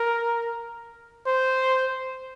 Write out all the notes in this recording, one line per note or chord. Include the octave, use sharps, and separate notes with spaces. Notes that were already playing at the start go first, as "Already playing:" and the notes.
Already playing: A#4
C5